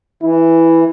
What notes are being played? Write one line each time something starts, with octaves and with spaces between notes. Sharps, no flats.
E3 E4